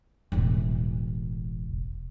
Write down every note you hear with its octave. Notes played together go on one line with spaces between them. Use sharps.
E1 A1